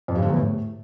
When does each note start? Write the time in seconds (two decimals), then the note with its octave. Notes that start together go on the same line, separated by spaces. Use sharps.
0.08 F2
0.15 G2
0.22 D3
0.30 E2
0.37 A2